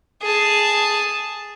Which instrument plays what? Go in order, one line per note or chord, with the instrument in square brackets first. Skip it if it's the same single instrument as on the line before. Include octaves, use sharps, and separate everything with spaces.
[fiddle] G#4 A5